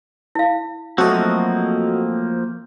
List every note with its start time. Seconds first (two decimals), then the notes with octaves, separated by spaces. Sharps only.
0.35 E4 F5
0.98 F3 F#3 A3 A#3 C4 F#4 A4 D#5